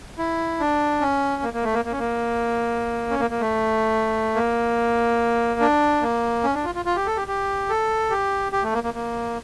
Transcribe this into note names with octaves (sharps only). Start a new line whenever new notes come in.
E4
D4
C#4
A#3
A#3
A3
A#3
A#3
C#4
A#3
C#4
A#3
A#3
A3
A#3
D4
A#3
C#4
D4
F4
F4
F4
G4
A4
G4
G4
A4
G4
G4
A3
A#3
A#3
A#3